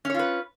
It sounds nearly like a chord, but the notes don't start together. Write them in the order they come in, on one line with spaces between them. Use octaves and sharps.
C#4 C#5 F4 B4